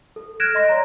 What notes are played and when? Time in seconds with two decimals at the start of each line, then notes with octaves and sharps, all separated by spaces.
0.16 A4
0.40 F6 F#6 G#6 A#6 D7 E7
0.55 D#5 C6 A#6
0.69 C#5 D5 A#5